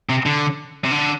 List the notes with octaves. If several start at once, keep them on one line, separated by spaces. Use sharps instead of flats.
C3
D3
C3
D3